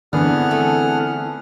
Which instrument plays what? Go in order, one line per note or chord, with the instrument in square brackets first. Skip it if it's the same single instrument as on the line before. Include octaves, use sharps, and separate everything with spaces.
[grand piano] D3 B3 [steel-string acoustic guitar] E3 C4 [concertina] G#4 F#5 F6
[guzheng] A3